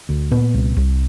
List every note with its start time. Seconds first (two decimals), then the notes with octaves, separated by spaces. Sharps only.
0.09 D2
0.31 A#2 B3
0.54 C2
0.77 C2